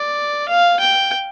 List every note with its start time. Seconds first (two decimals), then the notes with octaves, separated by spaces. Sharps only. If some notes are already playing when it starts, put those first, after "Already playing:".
Already playing: D5
0.49 F5
0.80 G5